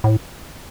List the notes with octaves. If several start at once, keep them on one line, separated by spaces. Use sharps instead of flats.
A2